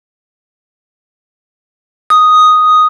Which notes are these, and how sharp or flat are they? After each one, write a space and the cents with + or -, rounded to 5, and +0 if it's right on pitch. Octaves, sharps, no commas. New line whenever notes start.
D#6 +0